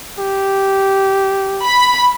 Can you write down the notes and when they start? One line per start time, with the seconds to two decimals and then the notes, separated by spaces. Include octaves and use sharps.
0.19 G4
1.65 B5